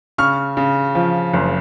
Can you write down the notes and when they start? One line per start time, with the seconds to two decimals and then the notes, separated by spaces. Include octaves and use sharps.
0.18 C#3 C#6 F6
0.57 C#3
0.95 F3
1.33 F#1